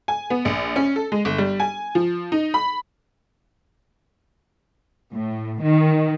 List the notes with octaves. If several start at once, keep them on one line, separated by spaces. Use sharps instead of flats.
G#5
B3
A#1
C#4
A4
G#3
G1
G3
G#5
F3
D#4
B5
A2
D#3